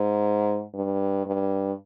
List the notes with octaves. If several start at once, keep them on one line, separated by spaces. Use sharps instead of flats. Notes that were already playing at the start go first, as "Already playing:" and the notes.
Already playing: G#2
G2
G2